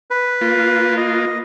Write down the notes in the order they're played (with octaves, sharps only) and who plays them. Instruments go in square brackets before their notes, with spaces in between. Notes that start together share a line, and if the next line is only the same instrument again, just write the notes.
[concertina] B4
[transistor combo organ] A#3 F4
[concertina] D#5